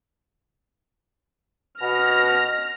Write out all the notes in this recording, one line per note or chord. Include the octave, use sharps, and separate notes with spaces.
B2 F6 A#6